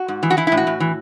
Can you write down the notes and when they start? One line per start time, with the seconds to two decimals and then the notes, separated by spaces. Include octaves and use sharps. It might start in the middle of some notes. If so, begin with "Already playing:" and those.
Already playing: F#4
0.08 G#2
0.23 E3
0.30 F#4
0.37 E3 E4
0.47 E4
0.52 A2
0.57 F#4
0.67 A2
0.80 E3